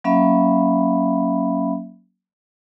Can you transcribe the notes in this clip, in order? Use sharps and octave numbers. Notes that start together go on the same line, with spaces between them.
F#3 A#3 C#4 E5 F5 B5